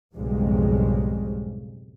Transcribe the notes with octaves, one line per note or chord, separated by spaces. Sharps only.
B1 F2 G#2 C#3 G3 G#3